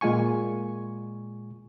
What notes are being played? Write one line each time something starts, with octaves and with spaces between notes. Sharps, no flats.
A#2 G#3 F4 G#5 C#6